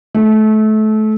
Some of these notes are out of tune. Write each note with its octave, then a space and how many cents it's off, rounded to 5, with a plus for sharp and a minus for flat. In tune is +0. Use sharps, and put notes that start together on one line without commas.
A3 -25